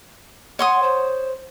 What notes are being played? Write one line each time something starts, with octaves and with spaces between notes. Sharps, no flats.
C#5 F#5 C6 D#6
C5